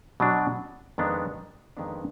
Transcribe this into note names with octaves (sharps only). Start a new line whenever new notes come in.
B2 F#3 D4
F2 D#3 G#3 B3 D4
F2 D#3 G#3 B3 D4